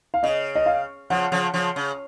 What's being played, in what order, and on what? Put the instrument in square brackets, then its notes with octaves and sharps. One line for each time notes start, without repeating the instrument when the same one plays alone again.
[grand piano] F5
[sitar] C#3 [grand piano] D#5
[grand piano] D#5
F5
[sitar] C#3 F3 [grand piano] F#5
[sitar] C#3 F3
C#3 F3
C#3